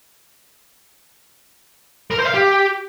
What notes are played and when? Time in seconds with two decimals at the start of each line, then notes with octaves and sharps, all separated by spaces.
2.11 A#4
2.18 C5
2.26 F5
2.34 G4